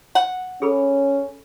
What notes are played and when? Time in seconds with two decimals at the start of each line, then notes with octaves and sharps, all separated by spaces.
0.15 F#5
0.62 C#4 G#4 A4 B5